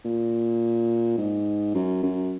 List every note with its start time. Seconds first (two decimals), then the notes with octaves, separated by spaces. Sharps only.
0.05 A#2
1.18 G#2
1.75 F#2
2.03 F#2